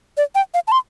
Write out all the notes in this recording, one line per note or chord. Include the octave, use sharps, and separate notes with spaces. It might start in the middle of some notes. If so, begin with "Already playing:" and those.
D5
G5
F5
A5
C6